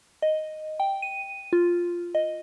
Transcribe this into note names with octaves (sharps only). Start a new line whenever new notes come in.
D#5
G5
D#7
F4
D#5